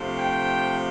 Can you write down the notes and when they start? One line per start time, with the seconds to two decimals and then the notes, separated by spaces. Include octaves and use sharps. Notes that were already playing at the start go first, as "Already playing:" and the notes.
Already playing: C3 F3 A3 D4
0.18 G5